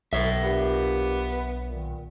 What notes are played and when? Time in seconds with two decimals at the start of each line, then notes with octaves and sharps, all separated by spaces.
0.13 B1 C#5 E5
0.43 A#2 B3 D4 G4
1.70 A#2 D#3